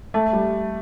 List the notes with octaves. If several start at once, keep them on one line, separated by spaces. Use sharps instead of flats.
A3
G3